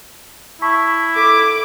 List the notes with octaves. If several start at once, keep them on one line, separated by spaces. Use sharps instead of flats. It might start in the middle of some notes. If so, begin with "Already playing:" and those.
E4 A5 C#6 B6
A4 D6 B6